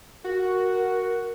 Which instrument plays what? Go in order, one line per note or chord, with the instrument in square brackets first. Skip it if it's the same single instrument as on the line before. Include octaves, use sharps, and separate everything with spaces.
[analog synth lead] F#4 [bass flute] A#4